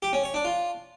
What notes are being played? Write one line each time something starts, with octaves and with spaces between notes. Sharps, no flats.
G4
C#4
C#5
D4
F4